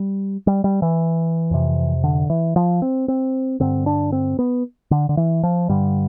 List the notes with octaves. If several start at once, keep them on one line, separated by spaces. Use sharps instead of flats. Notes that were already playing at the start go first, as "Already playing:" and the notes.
Already playing: G3
G3
G3
E3
F2 C3
D3
E3
F3
C4
C4
G2 D3 C4
D4
C4
B3
D3
D3
E3
F3
G2 D3 G3